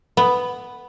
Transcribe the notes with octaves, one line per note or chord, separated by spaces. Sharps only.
B3